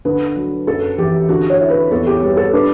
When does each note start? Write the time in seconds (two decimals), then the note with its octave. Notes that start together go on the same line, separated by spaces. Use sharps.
0.05 D3 B4
0.36 F#3
0.67 F#2 A4
0.98 E3 G4
1.29 D3 F#4
1.50 C#5
1.60 E4
1.70 B4
1.91 E2 A4
2.07 G4
2.22 G3 G4
2.37 A4
2.53 D4 B4